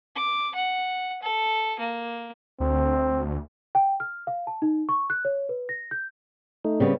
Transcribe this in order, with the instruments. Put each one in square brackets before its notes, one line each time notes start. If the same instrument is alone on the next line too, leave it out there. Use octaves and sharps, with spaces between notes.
[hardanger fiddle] D6
F#5
A4
A#3
[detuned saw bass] D2 [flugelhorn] C4
[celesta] G5
F6
F5
A5
D#4
C#6
F#6
C#5
B4
A#6
G6
[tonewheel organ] A3 D#4
[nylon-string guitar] C#3 G3 B3 [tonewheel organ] C4